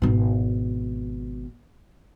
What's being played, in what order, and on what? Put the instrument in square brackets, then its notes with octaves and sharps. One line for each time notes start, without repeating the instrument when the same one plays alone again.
[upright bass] G#1 B2